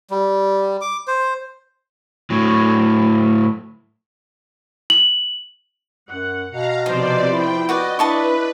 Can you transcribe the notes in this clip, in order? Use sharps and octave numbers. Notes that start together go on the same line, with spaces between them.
G3
D6
C5
A2 F#3
F#7
F#2 F#5
B2 F5 A#5
C3 F3 B3 D#4 C5 D5
E4 G5
F#4 B4 D5 D#5
D4 E4 B4 D#5 A5 C#6